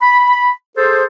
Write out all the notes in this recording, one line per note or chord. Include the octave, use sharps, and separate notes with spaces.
B5
G#4 A4 C5